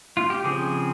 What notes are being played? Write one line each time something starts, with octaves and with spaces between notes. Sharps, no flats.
F4
G4
C#3 F3 C4 G#4